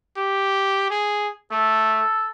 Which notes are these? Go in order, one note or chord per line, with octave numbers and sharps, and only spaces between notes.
G4
G#4
A3 A4